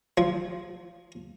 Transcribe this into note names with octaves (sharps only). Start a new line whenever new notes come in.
F3